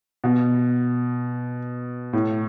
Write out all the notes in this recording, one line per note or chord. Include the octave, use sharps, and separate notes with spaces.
B2
A2